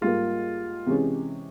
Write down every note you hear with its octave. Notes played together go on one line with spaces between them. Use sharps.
G#2 G3 A#3 F4
C3 E3 G#3 C#4 G4